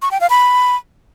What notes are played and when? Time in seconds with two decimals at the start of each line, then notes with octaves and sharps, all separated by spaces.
0.02 C#6
0.11 G5
0.21 F5
0.30 B5